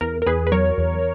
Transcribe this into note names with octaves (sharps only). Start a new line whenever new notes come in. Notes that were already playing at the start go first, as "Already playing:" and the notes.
E2 A#4
A#4
E2 G#4 B4
B4
F#3 A#4 C#5
E2